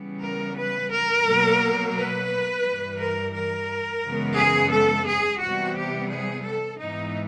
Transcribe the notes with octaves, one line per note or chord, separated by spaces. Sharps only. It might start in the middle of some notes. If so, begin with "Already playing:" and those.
Already playing: C#3 E3 G3 B3
A#4
B4
A#4
B2 F#3 A#3
B4
G2 E3 G3
A#4
A#4
F#2 C#3 E3 G#3 B3
G#4
A4
G#4
C3 E3 G3 B3 F#4
G4
G#4
A4
G#2 E3 G#3 B3 D#4